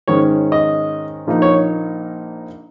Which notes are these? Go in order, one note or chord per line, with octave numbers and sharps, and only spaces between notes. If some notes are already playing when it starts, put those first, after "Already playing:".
G#2 D#3 G#3 C#4 C#5
D#5
A#1 A#2 F3 A#3 D#4
C#5